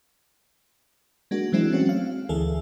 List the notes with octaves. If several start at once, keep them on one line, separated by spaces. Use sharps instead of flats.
G#3 A#3 D4 F#4
E3 F#3 G#3 C4 D4 E4
A3 C4 C#4 F#4
F5
D2 E3 G#4 A4 E5